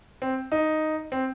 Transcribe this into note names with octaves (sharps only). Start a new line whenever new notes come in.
C4
D#4
C4